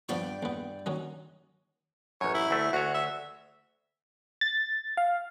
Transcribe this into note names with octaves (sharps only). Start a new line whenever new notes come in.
G2 F3 B3 D5 G5 C#6
E2 B3
D#3 F#3 C#4
A1 F#2 C#5
E4
D2 A3
D2 F#4 C#5
E5
A6
F5